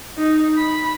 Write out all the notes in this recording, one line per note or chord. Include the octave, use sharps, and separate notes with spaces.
D#4
B5